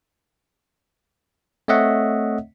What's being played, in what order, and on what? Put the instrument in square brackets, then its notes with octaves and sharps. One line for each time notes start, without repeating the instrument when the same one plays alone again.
[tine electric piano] A3 C4 C#5 D#5 E5 F#5